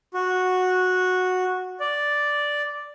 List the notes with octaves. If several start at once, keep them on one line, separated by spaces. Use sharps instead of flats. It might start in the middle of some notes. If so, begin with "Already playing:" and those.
F#4
D5